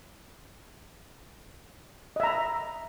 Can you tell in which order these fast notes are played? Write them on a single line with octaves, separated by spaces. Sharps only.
D#5 E5 A#5 B5